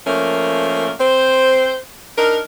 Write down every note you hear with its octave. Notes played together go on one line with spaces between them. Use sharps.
F3 A3 A#3 C#4 A#4
C4 C5
D4 D#4 A#4